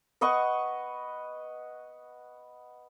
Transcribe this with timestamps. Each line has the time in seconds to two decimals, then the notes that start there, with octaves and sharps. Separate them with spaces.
0.21 B4 D#5 F#5 C#6